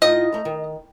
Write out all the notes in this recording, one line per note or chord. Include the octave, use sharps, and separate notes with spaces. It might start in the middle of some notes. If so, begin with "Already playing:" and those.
A2 D#4 F4 D#5
A3 A5 A#5
D#3